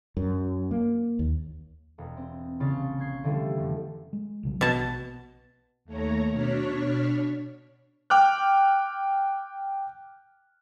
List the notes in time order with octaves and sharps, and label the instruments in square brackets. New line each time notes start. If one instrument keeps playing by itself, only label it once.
[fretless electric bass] F#2
A#3
D#2
[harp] E1
C4
A#1 C#3 F4 C#6 F6 A6
C#6 G6 G#6 C7
D3 E3 F3 G3 A3
F1
[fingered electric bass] G#3
B1 C#3 F#3
[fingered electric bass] A#1 B3 [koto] B2 A5
[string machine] D#2 A3 C#5 A#5
B2 D4 C#5 F6 B6
[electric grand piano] G5 D6 F6 F#6